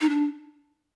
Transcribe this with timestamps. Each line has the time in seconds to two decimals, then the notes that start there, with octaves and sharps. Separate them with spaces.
0.01 D#4
0.10 D4